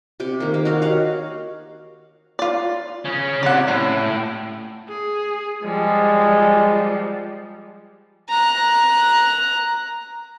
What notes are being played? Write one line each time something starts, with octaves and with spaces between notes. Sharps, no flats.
C3 G4 G5
D#3 A#3
A#3
F#4 C#5 D#5 F5
G4 C#5 F5 F#5
F4 D5
C#3 C#4
C3 D5 F#5
A2 C#4
G#4
F3 G3 G#3
A#5 F#6